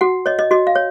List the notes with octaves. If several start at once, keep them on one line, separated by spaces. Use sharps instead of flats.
F#4 F#5
C#5 D#5
D#5
F#4 D#5
F5
C#5